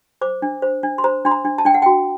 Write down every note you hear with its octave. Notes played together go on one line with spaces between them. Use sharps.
C5 D6
D4
C5
D4
C6
C5 A#5
D4 C6
A#5
D4
A5
D4 G5
F#5
F#4 G5